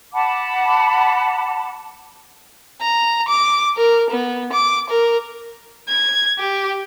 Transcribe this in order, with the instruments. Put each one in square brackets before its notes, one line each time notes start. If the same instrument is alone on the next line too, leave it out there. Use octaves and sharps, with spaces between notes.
[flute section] F#5 A5 B5 D6
[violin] A#5
D6
A#4
B3
D6
A#4
G#6
G4